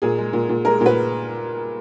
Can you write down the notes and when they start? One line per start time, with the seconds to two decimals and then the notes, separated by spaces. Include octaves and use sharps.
0.02 A#2 G#4
0.18 G#3
0.33 A#2
0.49 A#2
0.65 G#3 A#4
0.81 A#2
0.86 B4